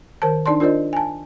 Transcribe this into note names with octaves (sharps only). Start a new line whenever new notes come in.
D#3 A#4 C5 A5
D4 D#4 D5 A5 C6
D4 F4 A#4 C5 D5 D#5
G#5 A5